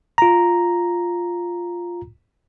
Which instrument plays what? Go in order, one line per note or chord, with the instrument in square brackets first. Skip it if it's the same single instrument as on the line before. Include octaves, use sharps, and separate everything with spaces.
[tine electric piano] F4 A#5